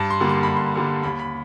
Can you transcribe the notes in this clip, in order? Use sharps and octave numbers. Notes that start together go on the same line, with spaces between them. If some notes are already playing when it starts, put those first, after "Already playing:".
Already playing: G2 A5
C6
D3 G3 A#3
C6
G2 B5
C6
D3 G3 A#3
D#2 B5
B5